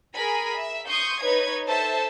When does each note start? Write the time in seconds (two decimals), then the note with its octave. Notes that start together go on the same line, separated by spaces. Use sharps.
0.15 G#4 A#4 G#5 B5
0.57 E5
0.88 C6 C#6 D#6 G6
1.21 D#4 B4 C#5 G#6
1.67 A4 C5 E5 A5